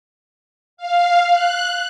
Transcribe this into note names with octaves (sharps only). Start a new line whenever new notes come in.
F5
F#6